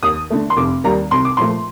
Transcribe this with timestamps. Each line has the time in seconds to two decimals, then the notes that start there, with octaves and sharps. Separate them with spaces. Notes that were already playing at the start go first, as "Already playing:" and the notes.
0.03 D#2 D#6
0.30 D3 A3
0.50 C6
0.57 F1 D6
0.84 D#2 D#3 G3 A#3 A#5
1.11 C2 C6
1.25 D6
1.37 A#2 F3 A3 C6